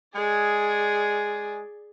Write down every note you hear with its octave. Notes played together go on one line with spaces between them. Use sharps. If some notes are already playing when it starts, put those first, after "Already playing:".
G#3 G#4 D5